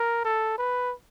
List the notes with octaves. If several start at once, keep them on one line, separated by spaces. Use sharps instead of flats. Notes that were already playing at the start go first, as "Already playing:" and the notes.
Already playing: A#4
A4
B4